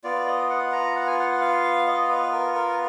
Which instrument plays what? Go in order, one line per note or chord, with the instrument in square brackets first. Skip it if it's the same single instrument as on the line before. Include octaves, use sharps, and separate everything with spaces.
[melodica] B3 F4 D5
D#5
F#5
A#5
F#5
G#5
F#5
F#5
F5
D#5
B4
A#4
A#4